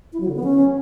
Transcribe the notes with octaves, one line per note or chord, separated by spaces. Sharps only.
E4
F#3
D3
B3
C#4